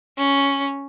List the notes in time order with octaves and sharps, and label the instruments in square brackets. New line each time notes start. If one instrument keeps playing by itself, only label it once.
[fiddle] C#4